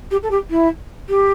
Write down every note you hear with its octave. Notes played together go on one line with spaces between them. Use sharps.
G4
A4
G4
E4
G4